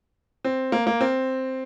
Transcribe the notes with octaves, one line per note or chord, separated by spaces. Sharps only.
C4
A#3
A#3
C4